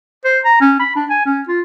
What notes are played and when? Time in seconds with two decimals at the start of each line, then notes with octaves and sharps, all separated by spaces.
0.24 C5
0.44 A#5
0.61 C#4
0.79 B5
0.96 D4
1.10 G#5
1.26 C#4
1.48 F4